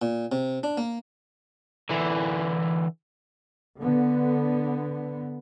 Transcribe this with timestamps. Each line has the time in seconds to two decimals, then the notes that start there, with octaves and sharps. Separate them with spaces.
0.02 A#2
0.32 C3
0.63 D4
0.77 A#3
1.90 D3 E3
3.79 D3 B3